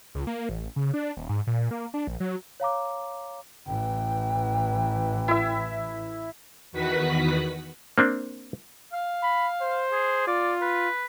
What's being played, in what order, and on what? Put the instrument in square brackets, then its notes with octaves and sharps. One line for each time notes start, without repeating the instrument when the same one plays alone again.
[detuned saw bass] C#2
A#3
A1
C#3
D4
D#1
G#2
A#2
A#3
D4
A#1
F#3
[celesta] C#5 F5 A#5 D6
[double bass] A1 E3 [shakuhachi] G5
[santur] E4 E5
[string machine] E2 D#3 F#4 B4 F#5 B6
[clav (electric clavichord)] A#3 C4 D4
[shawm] F5
[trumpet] B5
C5
[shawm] G#4
[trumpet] F4 [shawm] D5
[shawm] B4